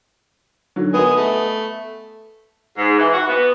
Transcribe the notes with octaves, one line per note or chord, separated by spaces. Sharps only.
D3 F#3
B3 D#5 G#5
A3
G#2
E3
F#4
B3